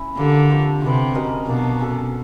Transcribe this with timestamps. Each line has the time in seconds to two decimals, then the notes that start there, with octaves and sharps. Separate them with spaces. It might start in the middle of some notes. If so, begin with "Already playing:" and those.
Already playing: C#4 E4
0.17 D3 A#3 D4 G4
0.50 F3 A3 C4
0.82 C3 B3 D4 F#4
1.14 C#4 F#4 A#4 D#5
1.46 B2 F#3 A#3 D4
1.79 C#4 F#4 A4